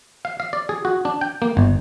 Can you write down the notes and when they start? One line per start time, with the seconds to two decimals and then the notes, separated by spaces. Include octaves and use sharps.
0.25 F5
0.40 F5
0.53 D5
0.69 G#4
0.85 F#4
1.05 D4
1.21 G5
1.42 A#3
1.57 G1